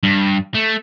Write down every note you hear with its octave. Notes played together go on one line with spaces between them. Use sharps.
G2
A3